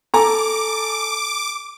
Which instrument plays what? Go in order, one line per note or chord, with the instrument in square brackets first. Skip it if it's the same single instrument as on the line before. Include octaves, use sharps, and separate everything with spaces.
[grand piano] A4 G#5 A#5 [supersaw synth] D6